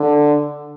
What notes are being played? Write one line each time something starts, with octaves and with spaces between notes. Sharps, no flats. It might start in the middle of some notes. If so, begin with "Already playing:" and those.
Already playing: D3